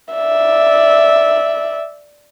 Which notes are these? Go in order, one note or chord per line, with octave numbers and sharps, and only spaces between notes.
D5 E5